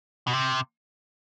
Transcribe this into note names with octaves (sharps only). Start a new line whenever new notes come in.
B2
C3